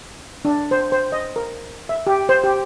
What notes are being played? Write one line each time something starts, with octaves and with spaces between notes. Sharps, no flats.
D4
C5
C5
D#5
A#4
E5
G4
C5
G4